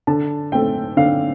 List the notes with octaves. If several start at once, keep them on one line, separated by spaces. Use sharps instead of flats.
D3 A5
A3 C4 G5
D3 F5